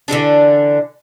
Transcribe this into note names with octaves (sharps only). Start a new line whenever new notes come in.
D3 E3 G3 D4